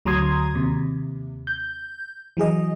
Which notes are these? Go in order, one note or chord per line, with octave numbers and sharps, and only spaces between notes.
D2 F#3 A#5 C6 D#6 G#6
D#2 C3
G6
E3 F#3 G#4 D#5